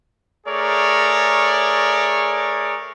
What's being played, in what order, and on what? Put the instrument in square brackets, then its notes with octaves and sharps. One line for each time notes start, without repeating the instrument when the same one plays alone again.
[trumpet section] A3 G#4 A#4 C#5 D5